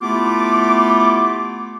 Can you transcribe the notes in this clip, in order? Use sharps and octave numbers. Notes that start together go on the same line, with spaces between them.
A3 B3 E4 F4 G4 D6